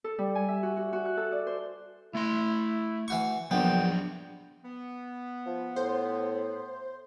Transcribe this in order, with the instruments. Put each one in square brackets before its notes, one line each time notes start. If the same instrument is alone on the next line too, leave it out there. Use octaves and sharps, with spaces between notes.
[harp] A4
G3
G#5
E5
F#4
F#4
F#4
F#6
A4
D5
C5
[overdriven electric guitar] A3 C6 [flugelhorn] E4
[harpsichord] E3 F#4 C#6
[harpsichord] A#1 B3 [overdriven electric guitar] F#3 D4 [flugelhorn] G5
[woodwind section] B3
[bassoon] F3
[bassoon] A2 [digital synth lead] C5